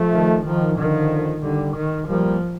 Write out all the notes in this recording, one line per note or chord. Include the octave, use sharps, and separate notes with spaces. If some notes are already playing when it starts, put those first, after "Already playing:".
Already playing: F3 A3
D#3
D#3 F3
D3 D#3 F3
D3 D#3 G3
D#3
F3 G3 A#3